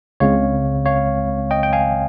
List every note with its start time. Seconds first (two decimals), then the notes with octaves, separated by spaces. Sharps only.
0.20 C#2 C#3 G#3 C4 C#5 F5
0.86 C#5 F5
1.51 D#5 G5
1.63 G5
1.73 F5 G#5